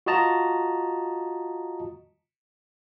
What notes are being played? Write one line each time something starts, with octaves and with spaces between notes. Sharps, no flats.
F4 F#4 D#5 A5 A#5